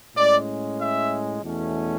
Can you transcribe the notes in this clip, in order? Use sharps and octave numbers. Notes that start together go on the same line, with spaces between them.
A2 G#3 C#4 D5
E5
E2 B2 A3 C#4